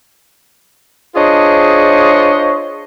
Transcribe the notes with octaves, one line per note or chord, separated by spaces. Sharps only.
D4 F4 G#4 C5 C#5 D#5